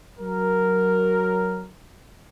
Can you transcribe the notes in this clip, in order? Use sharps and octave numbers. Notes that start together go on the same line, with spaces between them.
F#3 A#4